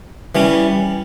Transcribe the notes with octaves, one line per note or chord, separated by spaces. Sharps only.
E3 G3 C#4